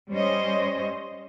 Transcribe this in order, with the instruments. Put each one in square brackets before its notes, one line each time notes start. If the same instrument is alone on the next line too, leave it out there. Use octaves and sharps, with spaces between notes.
[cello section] G3 C#4 C5 C#5 D#5